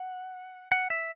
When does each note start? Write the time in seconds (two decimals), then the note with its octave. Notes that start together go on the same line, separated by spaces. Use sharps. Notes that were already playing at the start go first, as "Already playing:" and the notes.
Already playing: F#5
0.72 F#5
0.90 E5